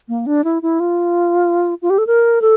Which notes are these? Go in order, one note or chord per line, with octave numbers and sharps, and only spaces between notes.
A#3
D4
E4
E4
F4
F4
G4
A4
A#4
A4